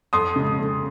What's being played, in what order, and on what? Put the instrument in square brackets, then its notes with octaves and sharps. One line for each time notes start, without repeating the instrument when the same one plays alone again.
[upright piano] F2 C6 D#6
C#3 G#3
F2